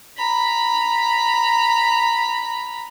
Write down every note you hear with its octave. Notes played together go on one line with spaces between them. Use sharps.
A#5 B5